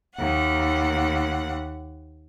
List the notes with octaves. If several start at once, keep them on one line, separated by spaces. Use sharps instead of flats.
D#2 F#5